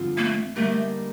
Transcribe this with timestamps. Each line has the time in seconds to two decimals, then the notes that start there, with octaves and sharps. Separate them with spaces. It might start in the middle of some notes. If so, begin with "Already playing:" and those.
Already playing: G2 D3 F3 C4 F4
0.17 A#3
0.24 A3
0.56 D3 G3 A3 A#3 D#4